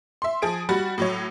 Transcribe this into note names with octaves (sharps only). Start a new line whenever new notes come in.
E5 C6
F3 G#4 D7
G3 F#4 B5 A6
A2 F#3 C#5